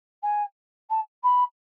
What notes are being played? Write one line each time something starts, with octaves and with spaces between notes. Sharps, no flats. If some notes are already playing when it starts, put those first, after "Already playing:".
G#5
A5
B5